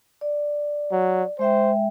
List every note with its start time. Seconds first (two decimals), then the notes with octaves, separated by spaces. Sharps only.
0.21 D5
0.92 F#3
1.39 G#3 C5 E5 G5